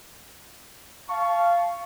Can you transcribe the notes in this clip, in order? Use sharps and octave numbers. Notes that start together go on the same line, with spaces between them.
F5 A5 C#6